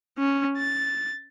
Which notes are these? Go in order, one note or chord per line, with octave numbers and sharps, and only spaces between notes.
C#4
A6